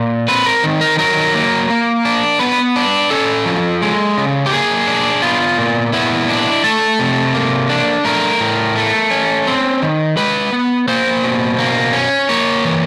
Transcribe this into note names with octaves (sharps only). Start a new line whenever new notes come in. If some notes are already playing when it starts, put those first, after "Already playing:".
Already playing: A#2
C4 B4
A#4
D#3
A#4
F#3 A#4
A#3
A#3
D4
B3 B4
D4
C#4 A4
F3
G#3
C#3
G4
A#3 G#4
D4
B3 F4
A#2
B3 E4
D4
A3 A4
C3
A#3
D4
A3 A#4
A2
A3
C#4
C4
D#3
G#3 B4
B3
A#3 C5
B2
A#3
C#4
A#3 C#5
E3